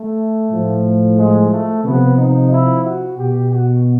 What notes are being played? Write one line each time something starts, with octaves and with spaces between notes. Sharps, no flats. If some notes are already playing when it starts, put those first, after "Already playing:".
Already playing: A3
A2 F3
G#3
A3
C3 F3 B3
D#4
E4
F#4
B2 G4
F#4